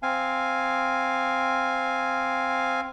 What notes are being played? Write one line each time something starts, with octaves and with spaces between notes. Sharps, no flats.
C4 F5 G#5